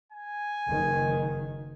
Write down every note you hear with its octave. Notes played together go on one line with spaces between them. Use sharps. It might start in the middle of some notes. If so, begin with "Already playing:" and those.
G#5
F#1 D#3